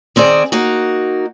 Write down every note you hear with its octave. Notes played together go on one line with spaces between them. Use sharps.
D#3 C4 G#4 D5
A#3 D#4 F#4